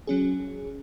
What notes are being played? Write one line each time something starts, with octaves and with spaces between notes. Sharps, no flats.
F#3 C#4 G#4